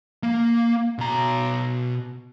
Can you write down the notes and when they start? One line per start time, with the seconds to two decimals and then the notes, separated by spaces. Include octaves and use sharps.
0.23 A#3
0.99 B2 A#5